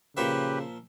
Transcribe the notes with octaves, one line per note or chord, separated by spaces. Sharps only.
A#2 C#3 F3 G4 B4 E5